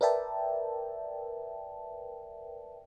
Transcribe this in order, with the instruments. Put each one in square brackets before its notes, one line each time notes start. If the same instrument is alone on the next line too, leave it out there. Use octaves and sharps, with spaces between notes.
[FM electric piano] A#4 B4 D5 E5 G5 A5